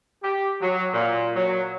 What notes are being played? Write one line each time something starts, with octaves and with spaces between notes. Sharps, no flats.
G4
F#3
A#2
F#3